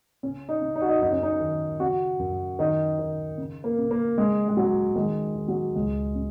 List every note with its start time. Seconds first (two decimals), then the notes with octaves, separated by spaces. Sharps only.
0.23 C#3 C#4
0.49 D#4
0.62 C#3
0.76 D#4
0.82 F#4
0.89 D#4
1.01 F#2 D#4
1.12 C#4
1.23 D#4
1.40 D#3
1.80 C#3 F#4
2.19 F#2
2.59 D#3 D#4
2.99 D#3
3.38 C#3
3.64 A#3
3.78 C#3
3.91 A#3
4.17 C#3 G#3
4.48 G#3
4.57 C#3 F#3
4.95 D#3 G#3
5.35 D#3
5.48 F#3
5.75 C#2 G#3
6.15 C#3